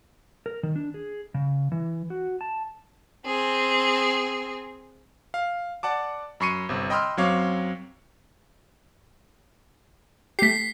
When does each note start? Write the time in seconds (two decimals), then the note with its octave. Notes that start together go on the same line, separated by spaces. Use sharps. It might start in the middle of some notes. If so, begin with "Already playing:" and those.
0.46 A#4
0.63 D#3
0.76 D4
0.94 G#4
1.34 C#3
1.72 E3
2.10 F#4
2.41 A5
3.26 C4 G#4
5.34 F5
5.83 D5 F#5 A5 D6
6.40 F#2 B5 C#6 C7 C#7 D#7
6.69 G1 C3
6.90 D#5 G5 B5 C6 E6 F6
7.17 F#2 F#3 C4 C#5 F5 D6
10.39 A3 G4 B6 C7